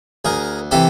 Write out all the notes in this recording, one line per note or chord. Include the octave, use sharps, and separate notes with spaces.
D2 G#4 A#4
C3 E3 G4 A4